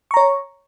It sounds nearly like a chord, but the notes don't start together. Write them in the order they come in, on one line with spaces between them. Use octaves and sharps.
C#6 A#5 C#5